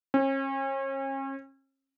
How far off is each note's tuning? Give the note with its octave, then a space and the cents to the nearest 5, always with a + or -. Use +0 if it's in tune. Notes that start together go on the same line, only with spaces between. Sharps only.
C#4 -40